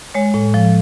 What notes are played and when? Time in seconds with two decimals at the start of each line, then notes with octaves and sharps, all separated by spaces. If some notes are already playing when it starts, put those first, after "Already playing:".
0.14 G#3 C#5
0.34 A2
0.54 F3